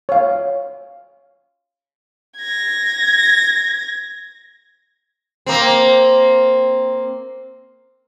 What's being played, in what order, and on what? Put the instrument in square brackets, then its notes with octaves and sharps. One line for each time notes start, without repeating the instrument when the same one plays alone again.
[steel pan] C#5 F5
[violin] G#6 A#6
[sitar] A#3 C4